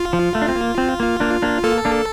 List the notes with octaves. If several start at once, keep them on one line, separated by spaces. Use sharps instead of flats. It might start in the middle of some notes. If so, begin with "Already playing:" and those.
Already playing: F4
F3
A3
D4
C4
A#3
C4
A#3
A#3 D4
A#3 D4
A#3 A4
A#3 D4